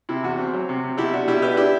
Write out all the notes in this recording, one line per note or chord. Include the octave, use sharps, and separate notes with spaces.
C3 E4
E2 F#4
C4
F#3
C3
C3
B2 E4 G4
D4 F#4
B2 E4 G4
D4 G4 B4
D4 E4 G4